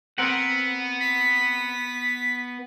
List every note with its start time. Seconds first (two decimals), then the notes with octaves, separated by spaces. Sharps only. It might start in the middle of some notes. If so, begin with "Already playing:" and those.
0.18 B3 C4 A#4 F#5
1.00 B6